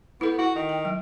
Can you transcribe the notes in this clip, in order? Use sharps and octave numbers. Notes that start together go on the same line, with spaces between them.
B3 E4 A4
E4 F#4
D#3
G5
F#3